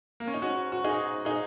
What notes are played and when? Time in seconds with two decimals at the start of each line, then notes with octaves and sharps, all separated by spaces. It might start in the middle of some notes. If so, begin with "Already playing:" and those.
0.20 A#3
0.28 C#4
0.34 D#4
0.42 G#2 C#4 F#4
0.72 F#4
0.84 D#4 G#4
1.25 D#4 G#4